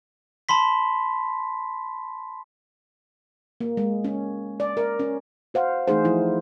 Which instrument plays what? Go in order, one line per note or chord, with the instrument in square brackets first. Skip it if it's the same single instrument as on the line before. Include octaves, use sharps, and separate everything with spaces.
[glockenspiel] A5 B5 C6 B6
[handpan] A#3
G#3
C#4
D5
A#4
C#4
F#4 C5 F5 F#5
E3 A3 D#4 G#4 C5
F3 E4